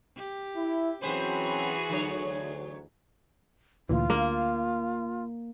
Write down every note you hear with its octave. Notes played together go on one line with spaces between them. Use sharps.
G4
E4
E3 F#3 C4 C#4 F#4 G#4 B4 C5
D2 D3 F#3 C#5
D2 A#2 E3 F4
D2 A#3